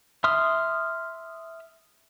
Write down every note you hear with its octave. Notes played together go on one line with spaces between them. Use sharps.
E5 C6 D#6 F6